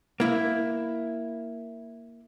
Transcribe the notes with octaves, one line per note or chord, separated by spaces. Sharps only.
A#3 E4